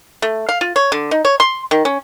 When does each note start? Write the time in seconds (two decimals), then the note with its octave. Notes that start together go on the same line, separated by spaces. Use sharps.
0.22 A3
0.49 F5
0.61 F4
0.76 C#5
0.92 D3
1.11 D#4
1.25 C#5
1.40 C6
1.71 D#3
1.85 C#4